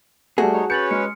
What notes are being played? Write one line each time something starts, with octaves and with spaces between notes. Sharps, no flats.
G3 A3 F#4 G#4 F#5 G#5 A5
D#4 C#5
C#4 B4 C#5 G6 A6 C#7 F#7
G#3 F6 C#7